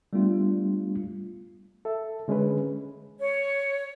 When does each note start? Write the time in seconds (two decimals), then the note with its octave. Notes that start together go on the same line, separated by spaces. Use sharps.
0.13 G3 A3 B3 D4 F4
1.85 A4 E5
2.28 D3 G#3 C#4 G#4 B4
3.20 C#5